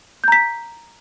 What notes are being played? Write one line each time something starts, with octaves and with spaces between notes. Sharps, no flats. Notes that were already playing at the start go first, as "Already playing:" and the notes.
A#5 G6 B6